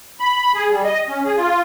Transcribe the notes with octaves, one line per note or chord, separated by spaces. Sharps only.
B5
G#4
G3
D#5
C#4
G#4
F4